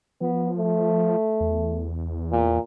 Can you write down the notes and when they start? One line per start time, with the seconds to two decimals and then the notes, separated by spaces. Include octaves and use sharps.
0.21 F3 B3
0.57 A3
1.40 E2
2.32 A#2